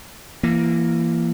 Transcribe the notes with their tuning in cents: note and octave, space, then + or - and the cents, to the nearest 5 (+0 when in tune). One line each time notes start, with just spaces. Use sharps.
E3 +25 A#3 +0